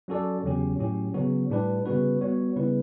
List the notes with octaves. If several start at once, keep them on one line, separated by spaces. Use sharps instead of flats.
F#3 C#4 F#4 A4 D5
E2 C#3 F#3 C#4 G4
A2 F#3 C#4 G4
C#3 F#3 B3 F#4
A2 G3 D4 G4 B4
C#3 G3 B3 F#4 B4
G3 B3 F#4 C#5
C#3 G3 B3 E4 B4